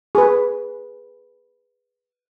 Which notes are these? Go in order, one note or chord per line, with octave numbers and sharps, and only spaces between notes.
G#4 B4